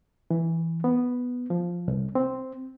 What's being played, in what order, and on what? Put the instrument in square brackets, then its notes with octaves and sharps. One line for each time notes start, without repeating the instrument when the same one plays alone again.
[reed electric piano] E3
B3
F3
C2
C4